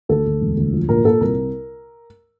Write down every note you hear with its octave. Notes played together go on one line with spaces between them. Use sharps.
D2 A4
D2
E1
D2
F3
A#2 A#4
A#2 A4
C2 A#4